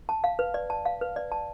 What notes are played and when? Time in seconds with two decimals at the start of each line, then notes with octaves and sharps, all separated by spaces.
0.09 A5
0.24 F5
0.39 B4
0.54 D5
0.70 A5
0.85 F5
1.01 B4
1.16 D5
1.32 A5